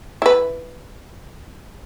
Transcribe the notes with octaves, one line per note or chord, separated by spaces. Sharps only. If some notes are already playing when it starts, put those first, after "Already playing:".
E4 B4